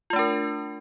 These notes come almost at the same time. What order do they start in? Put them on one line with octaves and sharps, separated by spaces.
F4 A3 D4 A#4